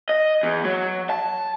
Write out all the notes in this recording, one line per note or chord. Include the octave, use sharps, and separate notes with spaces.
D#5
E2
F#3
A5